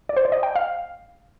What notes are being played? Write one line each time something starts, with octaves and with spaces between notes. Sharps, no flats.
D5
C5
D5
D#5
G5
F5